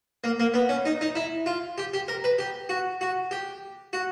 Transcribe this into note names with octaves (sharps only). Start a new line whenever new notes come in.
A#3
A#3
B3
C#4
D#4
D#4
E4
F4
G4
G4
A#4
B4
G4
F#4
F#4
G4
F#4